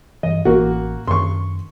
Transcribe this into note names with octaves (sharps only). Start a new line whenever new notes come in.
G2 E3 D#5
A1 E3 A#3 F#4
F#2 D#3 C6 C#6